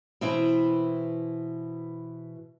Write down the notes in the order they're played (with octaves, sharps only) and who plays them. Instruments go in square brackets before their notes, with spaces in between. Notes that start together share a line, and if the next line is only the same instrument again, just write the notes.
[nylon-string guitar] B2 E3 C4 E4